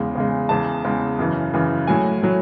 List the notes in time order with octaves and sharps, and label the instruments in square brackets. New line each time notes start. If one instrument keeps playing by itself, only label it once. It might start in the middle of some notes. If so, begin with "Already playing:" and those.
Already playing: [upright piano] E2 C#3 G#3
E2 C#3 G#3
E2 C#3 G#3 A5
E2 C#3 G#3
F#2 C#3 E3
F#2 C#3 E3
A2 F#3 G#5
A2 F#3